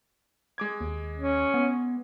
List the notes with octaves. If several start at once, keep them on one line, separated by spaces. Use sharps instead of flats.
G#3 D6 G#6
D#2
C#4
B3